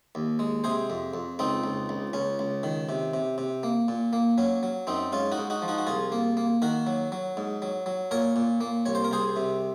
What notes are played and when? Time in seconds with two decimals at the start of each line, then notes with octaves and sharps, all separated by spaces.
0.15 D#2
0.39 G#3
0.64 C3 G#4 C5
0.90 F2
1.14 F2
1.39 C#2 C4 D#4
1.64 C#2
1.89 C#2
2.13 C#2 C#4
2.39 C#2
2.63 D#3
2.89 C3
3.14 C3
3.38 C3
3.63 A#3
3.88 A#2
4.13 A#3
4.38 F#3 C#4
4.63 F#3
4.87 F#2 C4 D#4
5.12 G#2 C#4 F4
5.32 D#4 F#4
5.38 G#2
5.50 D#4 F#4
5.62 F3
5.68 D#4 F#4
5.78 F#4
5.87 C2 F4 G#4
6.12 A#3
6.37 A#3
6.62 D#3 F#4 A#4
6.87 F#3
7.12 F#3
7.37 G#2
7.62 F#3
7.86 F#3
8.11 A#2 A#4 C#5
8.36 A#2
8.61 A#3
8.86 C2 C#5
8.95 C5
9.04 A#4
9.11 C2 G#4 C5
9.36 C3